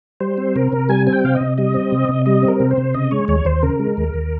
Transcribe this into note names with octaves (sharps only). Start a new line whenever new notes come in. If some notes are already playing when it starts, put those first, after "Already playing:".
G3 C5
C4
C3 A#4
C3
G3 G#5
C4 G#5
G5
C3 F5
D#5
C3
G3 D#5
C4
C3
C3
G3 D#5
C4
A#4
C3
C5
C3
C#3 D#5
G#3 C#5
D#2 C#5
D#2 C5
C#3 A#4
G#3
D#2
D#2